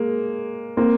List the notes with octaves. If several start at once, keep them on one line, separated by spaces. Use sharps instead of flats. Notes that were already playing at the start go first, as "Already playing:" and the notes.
Already playing: G#3 A#3
A#3 C4